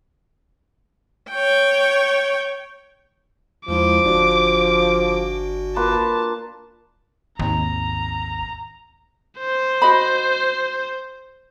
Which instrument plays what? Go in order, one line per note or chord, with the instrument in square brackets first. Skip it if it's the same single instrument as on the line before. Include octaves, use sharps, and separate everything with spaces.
[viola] C#5 G5
[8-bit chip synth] E2 G#3 E4 [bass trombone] F3 [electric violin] D6
[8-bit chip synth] G1 F#4 [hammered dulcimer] D4
[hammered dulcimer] A#3 F4 B4 [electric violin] A5
[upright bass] G#1 [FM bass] D#2 [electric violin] A#5
[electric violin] C5
[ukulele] F#4 D#5 B5